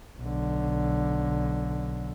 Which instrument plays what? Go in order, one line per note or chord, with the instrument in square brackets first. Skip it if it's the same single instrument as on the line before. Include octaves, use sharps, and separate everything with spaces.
[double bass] B1 D3